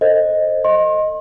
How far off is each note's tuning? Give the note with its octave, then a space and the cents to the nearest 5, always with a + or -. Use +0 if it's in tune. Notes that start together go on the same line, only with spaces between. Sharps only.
A4 +45 C5 +15 D#5 +0
D#5 +0 C6 +40